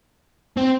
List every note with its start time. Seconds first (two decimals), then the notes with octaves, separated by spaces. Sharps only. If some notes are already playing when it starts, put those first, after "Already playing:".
0.57 C4